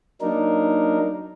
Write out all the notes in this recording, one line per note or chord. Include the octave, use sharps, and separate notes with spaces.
F#3 A#3 D4 D#4 A#4